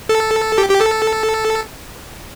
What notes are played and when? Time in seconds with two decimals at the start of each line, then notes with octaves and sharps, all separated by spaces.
0.09 A4
0.58 G4
0.69 G4
0.81 A4